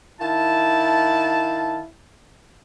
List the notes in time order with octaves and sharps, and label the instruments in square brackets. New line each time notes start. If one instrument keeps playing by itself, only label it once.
[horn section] D#3 F5 A5 [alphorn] E4